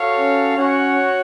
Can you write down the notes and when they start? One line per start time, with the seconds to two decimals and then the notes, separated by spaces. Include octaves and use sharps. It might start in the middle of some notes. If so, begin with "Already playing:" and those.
Already playing: F#4 A4 C#5 F5
0.19 C#4
0.57 C#4 F#4 C#5 F#5